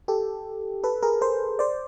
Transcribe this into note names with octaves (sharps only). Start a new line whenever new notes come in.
G4 A4
A4 B4
G#4 A#4
A#4 C5
C5 D5